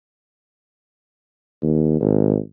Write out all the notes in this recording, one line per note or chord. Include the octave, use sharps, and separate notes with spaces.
D#2
G#1